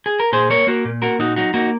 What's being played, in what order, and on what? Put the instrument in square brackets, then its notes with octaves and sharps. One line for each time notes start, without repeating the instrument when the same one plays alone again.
[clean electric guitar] G#4
A#4
A#2 G#4 C5
A#3 A#4 C#5
A#3 F#4 A#4
A#2
A#3 F#4 A#4
A#2 D#4 F#4
F#3 D#4 F#4
A#3 D#4 F#4